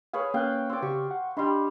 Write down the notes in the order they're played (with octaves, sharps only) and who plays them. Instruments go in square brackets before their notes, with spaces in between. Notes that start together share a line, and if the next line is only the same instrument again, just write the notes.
[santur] G#4 B4 C#5 [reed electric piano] F5
[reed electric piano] A#3 C#4 F#6 [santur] F5 G5
[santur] C4 D5
[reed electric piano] C#3 F#4 G4 [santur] C#6
[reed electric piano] F#5
[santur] G3 B5 [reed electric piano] D4 D#5 C6